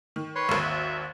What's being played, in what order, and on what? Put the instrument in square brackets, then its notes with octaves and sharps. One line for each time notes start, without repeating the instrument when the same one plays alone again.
[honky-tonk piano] D#3
[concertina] B4 C#5 C6
[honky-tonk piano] G#1 D#2
[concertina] E5